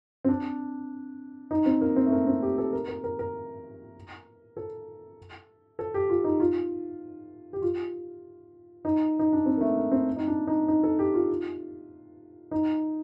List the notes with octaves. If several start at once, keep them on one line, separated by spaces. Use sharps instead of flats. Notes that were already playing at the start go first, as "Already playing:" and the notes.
C4
D4
D#4
C4
A#3
C4
A3
A#3
C4
G4
A4
A#4
A#4
A#4
A#4
A4
A4
G4
F4
D#4
F4
G4
F4
D#4
D#4
D4
C4
A#3
A3
A#3
C4
D#4
D4
D#4
D#4
A4
G4
F4
D#4